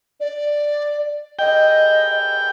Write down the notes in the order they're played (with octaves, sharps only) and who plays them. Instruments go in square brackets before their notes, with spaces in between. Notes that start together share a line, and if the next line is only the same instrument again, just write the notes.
[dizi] D5
[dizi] D#5 [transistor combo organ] G5